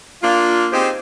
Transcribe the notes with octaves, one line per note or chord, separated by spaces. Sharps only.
A#3 D4 F4
C4 D#4 G4 G#4 C5